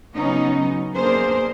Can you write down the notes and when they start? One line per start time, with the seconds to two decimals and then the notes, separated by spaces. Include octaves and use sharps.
0.16 C#3 F#3 B3 C#4 D#4
0.94 A#3 B3 D4 G#4 A#4 C5